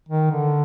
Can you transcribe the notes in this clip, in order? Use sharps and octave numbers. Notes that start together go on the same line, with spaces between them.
D#3
D3